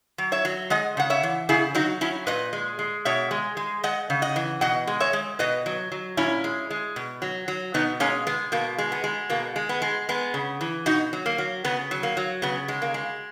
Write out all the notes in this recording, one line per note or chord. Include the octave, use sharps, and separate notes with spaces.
F#3
C#5 E5
F#3
G#3 D#5 F#5
C#3 F#5
C#5 E5
E3
C#3 E4 G#4
F#3 D#4 F#4
F#3 C#4 E4
A#2 B4 D#5
G#3
G#3
B2 C#5 E5
G#3
G#3
G#3 D#5 F#5
C#3
D#5 F#5
E3
B2 D#5 F#5
G#3
C#5 E5
G#3
B2 B4 D#5
F#3
F#3
A#2 C#4 E4
G#3
G#3
B2
F#3
F#3
B2 B3 D#4
G#3 A#3 C#4
G#3 B3
B2 A#3
G#3
B3
G#3
B2 A#3
G#3
B3
G#3
G#3 B3
C#3
E3
B2 D#4 F#4
F#3
A#3
F#3
C#3 B3
F#3
A#3
F#3
C#3 B3
G#3
A#3
G#3